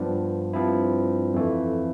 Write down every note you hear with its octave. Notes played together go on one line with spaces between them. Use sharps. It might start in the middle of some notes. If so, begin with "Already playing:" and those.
Already playing: G2 F3 B3 D4
G2 F3 C4 E4
F2 E3 A3